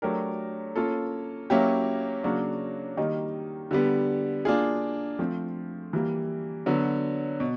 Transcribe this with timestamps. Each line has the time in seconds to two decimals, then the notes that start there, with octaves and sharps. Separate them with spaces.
0.02 F#3 A3 D4 G4 A#4
0.76 A#3 C#4 F4 A4
1.50 F#3 A#3 C#4 E4 G4
2.24 C#3 F#3 A#3 D4 F#4
2.97 D#3 G3 A#3 D#4
3.71 D3 G3 B3
4.45 A#3 D4 F4 G#4
5.19 F3 A3 C4
5.93 E3 G3 A#3
6.66 D3 F#3 B3
7.40 B2